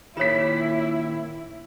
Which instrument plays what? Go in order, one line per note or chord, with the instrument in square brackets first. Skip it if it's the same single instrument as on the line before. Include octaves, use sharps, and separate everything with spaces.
[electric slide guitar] A#2 D#3 [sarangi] E4 [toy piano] F4 C#5 [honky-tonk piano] B6 E7